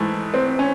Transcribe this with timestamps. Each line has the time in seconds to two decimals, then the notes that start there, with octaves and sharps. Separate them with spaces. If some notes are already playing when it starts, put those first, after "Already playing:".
Already playing: G#2 E3 A3
0.34 C4
0.59 C#4